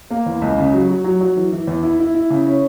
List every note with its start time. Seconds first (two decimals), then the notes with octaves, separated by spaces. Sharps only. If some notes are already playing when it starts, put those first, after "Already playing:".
0.10 A#3
0.26 E2
0.42 C#2
0.58 C#3
0.73 F#3
0.89 F#3
1.04 F#3
1.21 F#3
1.37 E3
1.52 E3
1.67 E2
1.83 E4
1.99 E4
2.15 E4
2.30 C#3
2.46 C#4